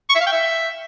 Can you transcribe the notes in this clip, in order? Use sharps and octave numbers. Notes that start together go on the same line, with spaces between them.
C#6
E5
F5
G5
E5